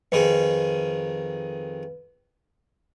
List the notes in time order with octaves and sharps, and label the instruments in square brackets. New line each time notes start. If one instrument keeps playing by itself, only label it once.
[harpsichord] F2 D#3 G#4 [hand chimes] B4